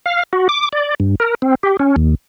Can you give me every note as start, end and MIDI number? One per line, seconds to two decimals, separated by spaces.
0.06 0.23 77
0.33 0.48 66
0.49 0.69 86
0.73 0.95 74
1.00 1.15 43
1.20 1.35 70
1.42 1.55 60
1.63 1.77 67
1.80 1.96 61
1.96 2.15 39